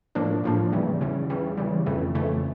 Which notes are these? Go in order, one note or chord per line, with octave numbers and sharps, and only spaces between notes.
A2 F3 A#3 D4
A2 F3 A#3 D4
E2 C#3 E3 G3
E2 C#3 E3 G3
E2 C#3 E3 G3
E2 C#3 E3 G3
F2 C#3 E3 A3
F2 C#3 E3 A3